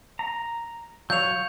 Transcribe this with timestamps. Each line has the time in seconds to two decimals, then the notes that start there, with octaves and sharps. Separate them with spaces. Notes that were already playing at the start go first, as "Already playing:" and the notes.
0.19 A#5
1.10 F#3 C#5 F5 G6 F7